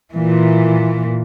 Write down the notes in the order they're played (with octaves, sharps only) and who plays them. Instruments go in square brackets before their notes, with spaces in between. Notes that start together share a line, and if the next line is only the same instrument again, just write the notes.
[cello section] A#2 E3